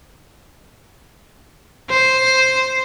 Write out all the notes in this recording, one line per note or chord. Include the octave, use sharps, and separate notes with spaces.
C5